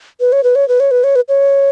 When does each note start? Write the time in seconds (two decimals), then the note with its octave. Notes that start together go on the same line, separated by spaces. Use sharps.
0.20 B4
0.32 C#5
0.44 B4
0.55 C#5
0.68 B4
0.80 C#5
0.91 B4
1.04 C#5
1.16 B4
1.28 C#5